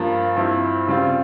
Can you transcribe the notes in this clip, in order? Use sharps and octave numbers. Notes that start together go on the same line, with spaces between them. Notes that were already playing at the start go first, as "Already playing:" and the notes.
Already playing: G2 F3 A#3 F4
G2 F3 C4 E4
C#3 G3 C4 F4